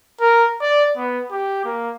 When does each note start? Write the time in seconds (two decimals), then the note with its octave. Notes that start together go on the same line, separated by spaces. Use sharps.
0.21 A#4
0.62 D5
0.96 B3
1.31 G4
1.65 A#3